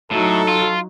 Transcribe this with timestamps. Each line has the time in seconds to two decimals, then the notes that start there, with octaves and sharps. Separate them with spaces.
0.11 A2 F#3 D#4 A4
0.48 F4